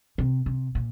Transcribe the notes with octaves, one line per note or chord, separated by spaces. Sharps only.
C3
C3
A#2